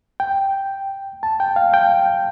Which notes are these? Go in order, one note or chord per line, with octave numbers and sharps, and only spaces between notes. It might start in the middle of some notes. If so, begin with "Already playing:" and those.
G5
A5
G5
F5
G5